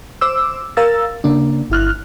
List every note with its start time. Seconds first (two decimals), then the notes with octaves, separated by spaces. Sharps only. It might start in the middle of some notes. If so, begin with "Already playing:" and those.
0.21 C5 D6 E6
0.77 A#4 F5 E6 A6
1.24 C#3 A#3 D4
1.70 G1 E4 F6 F#6